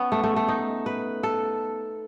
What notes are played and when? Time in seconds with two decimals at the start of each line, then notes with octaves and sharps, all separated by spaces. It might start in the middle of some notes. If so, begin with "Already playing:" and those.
Already playing: B3 C#4
0.12 A3
0.24 A3
0.36 A3
0.48 D#4
0.86 B4
1.23 A4